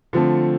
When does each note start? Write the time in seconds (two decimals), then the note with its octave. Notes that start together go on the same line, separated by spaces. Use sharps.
0.13 D3 F3 A3 C4